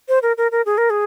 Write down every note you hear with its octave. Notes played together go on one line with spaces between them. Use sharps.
C5
A#4
A#4
A#4
G#4
A#4
G#4